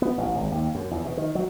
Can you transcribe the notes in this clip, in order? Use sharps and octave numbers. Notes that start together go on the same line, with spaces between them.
B3
A1
G#1
D#2
F#2
E2
B2
D#3
F#3